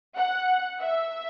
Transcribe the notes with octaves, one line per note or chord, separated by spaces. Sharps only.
F#5
E5